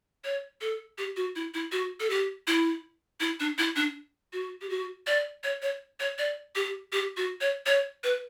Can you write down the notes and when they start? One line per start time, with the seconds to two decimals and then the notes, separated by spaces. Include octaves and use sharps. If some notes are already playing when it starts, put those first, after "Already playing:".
0.24 C#5
0.61 A4
0.98 G4
1.17 F#4
1.36 E4
1.54 E4
1.72 F#4
2.00 A4
2.10 G4
2.47 E4
3.20 E4
3.40 D4
3.58 E4
3.76 D4
4.33 F#4
4.61 G4
4.70 F#4
5.07 D5
5.44 C#5
5.62 C#5
6.00 C#5
6.18 D5
6.55 G4
6.92 G4
7.17 F#4
7.41 C#5
7.66 C#5
8.04 B4